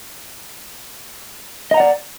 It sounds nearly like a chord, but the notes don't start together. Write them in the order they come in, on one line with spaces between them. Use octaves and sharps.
D#5 A#5 F#5 D5